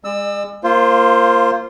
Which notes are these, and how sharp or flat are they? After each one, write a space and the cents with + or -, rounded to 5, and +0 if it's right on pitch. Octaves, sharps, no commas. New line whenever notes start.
G#3 -30 D5 +45 E6 +0
A#3 +0 F4 -15 C5 +15